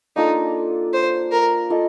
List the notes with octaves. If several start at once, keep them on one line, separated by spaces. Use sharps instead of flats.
A#3 D4 D#4 F4 A4
C5
A#4
A#3 F4 A4 D#5